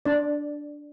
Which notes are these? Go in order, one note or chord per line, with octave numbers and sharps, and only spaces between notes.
D4 D5